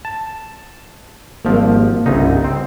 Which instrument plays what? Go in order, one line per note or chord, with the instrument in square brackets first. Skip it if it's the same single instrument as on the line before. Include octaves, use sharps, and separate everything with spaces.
[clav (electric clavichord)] A5
[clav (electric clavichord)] G#1 F3 [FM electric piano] G3 A#3
[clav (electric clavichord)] G1 C2 D#4 [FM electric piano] C#3
[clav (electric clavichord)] C4